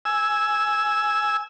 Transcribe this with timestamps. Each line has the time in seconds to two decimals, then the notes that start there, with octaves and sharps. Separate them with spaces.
0.05 G#5 E6